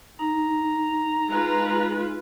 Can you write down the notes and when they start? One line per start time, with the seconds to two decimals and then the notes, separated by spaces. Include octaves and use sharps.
0.19 D#4 A#5
1.29 G#3 F4 B4